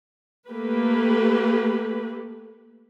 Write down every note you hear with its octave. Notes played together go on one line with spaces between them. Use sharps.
A3 A#3 G4 A4 B4